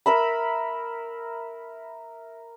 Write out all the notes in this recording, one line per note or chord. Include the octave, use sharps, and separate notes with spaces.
A#4 E5 B5